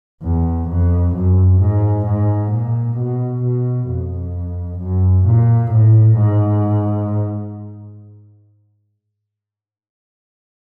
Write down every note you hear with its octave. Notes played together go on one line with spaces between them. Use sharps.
E2
F2
F#2
G#2
G#2
A#2
B2
B2
F2
F#2
A#2
A2
G#2